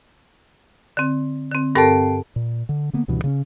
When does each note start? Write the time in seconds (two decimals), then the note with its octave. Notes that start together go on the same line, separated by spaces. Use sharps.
0.97 D3 C4
1.51 D3 C4
1.75 G2 C4 A4 A#4 G5 A5
2.36 A#2
2.69 D3
2.93 D3 A#3 B3
3.08 C#2 G2 B2 E3
3.24 C#3 B3 C#4